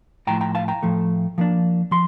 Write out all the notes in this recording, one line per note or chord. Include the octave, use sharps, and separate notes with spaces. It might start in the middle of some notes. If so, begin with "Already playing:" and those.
A2 F3 A3 G5 A#5
G5 A#5
F5 A5
G5 A#5
A2 F3 A3
F3 A#3 D4
F3 C6